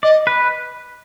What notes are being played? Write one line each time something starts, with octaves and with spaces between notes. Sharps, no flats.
D5 D#5
B4